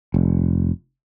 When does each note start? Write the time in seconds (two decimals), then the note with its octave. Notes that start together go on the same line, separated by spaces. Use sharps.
0.14 F1